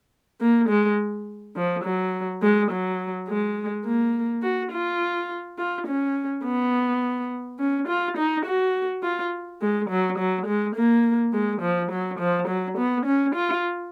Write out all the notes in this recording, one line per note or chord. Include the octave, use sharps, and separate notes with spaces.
A#3
G#3
F3
F#3
G#3
F#3
G#3
A#3
F#4
F4
F4
C#4
B3
C#4
F4
D#4
F#4
F4
G#3
F#3
F#3
G#3
A#3
G#3
F3
F#3
F3
F#3
B3
C#4
F4